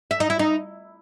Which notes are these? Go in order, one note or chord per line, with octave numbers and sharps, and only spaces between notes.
E5
D#4
E4
D#4